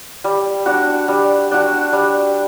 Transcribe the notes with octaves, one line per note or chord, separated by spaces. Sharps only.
G3
D4 F#4
G3
D4 F#4
G3